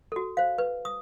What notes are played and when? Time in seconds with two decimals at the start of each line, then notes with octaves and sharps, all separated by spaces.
0.12 F#4 A4
0.37 C5 F5
0.58 B4
0.85 D#6